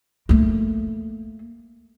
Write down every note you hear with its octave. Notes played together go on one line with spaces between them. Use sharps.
A3 A#3